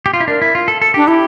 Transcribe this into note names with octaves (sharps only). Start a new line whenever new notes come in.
G4
F4
E4
D4 A#4
E4
F4
A4
A4
D4 G4
E4 G4